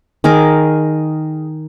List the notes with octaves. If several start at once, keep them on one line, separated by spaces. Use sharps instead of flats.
D#3 G#4 A#4 D6